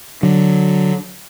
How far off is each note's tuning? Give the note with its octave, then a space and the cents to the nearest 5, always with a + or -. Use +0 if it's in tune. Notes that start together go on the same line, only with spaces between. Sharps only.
D3 +0 F#3 +0